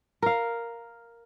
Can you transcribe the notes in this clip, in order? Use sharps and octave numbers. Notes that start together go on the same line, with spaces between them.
A#4 F5